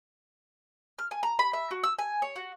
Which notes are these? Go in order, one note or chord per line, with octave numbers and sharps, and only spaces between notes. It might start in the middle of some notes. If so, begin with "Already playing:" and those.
F6
G#5
A#5
B5
E5
F#4
E6
G#5
C#5
F#4